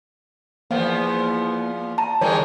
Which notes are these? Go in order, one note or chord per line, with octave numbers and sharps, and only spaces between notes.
E2 F3 A#3 B3
A5 A#5
D#3 E3 G3 G#3 C#5